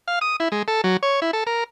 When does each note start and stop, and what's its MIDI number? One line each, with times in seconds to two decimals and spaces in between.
0.08 0.19 77
0.21 0.36 87
0.40 0.48 64
0.52 0.63 56
0.68 0.81 69
0.84 0.97 54
1.03 1.20 73
1.22 1.31 64
1.33 1.44 69
1.47 1.64 70